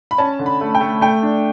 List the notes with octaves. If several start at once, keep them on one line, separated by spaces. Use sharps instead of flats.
B5
C#4 A5
D3
B5
A3
G5
A3
A3 G5
D4